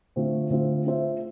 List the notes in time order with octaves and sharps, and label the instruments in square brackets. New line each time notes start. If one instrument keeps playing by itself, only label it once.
[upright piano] D3 A3 C4 F4
D3 A3 C4 F4
C4 F4 C5 E5